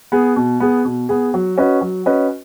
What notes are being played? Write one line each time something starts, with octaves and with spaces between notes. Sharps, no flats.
B3 G#4
B2
B3 G#4
B2
B3 G#4
F#3
C#4 F#4 B4 D#5
F#3
C#4 F#4 B4 D#5